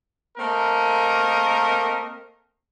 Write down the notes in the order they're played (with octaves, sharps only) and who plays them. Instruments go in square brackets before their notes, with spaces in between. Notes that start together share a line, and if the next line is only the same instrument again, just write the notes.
[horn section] A3 A#3 C4 A#4 D#5